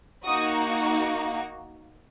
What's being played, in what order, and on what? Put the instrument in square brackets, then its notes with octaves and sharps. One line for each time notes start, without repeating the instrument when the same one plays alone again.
[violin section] A#3 D#4 F#4 D#6